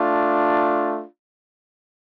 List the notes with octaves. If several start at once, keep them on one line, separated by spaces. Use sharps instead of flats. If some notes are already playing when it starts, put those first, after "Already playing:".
Already playing: A3 D4 F4